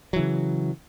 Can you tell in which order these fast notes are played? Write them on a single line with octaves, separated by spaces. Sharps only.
F#3 E3 C#3